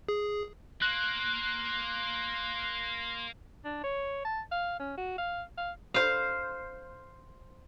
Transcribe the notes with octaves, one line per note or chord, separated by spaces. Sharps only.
G#4
A#3 C6 F#6
D4
C#5
A5
F5
C#4
F#4
F5
F5
C5 F5